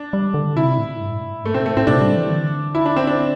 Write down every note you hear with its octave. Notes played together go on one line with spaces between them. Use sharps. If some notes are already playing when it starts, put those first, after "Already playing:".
Already playing: D4
G3
D3
C3 E4
A2
G2
A2
G2 A3
C3 C4
A2 A3
A2 C4
C3 D4
G3
E3
D3
E4
D4
C4
D4